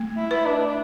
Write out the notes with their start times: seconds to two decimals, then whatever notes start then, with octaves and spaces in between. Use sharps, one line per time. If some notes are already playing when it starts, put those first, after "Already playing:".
Already playing: A3
0.16 E4
0.31 B4
0.46 D4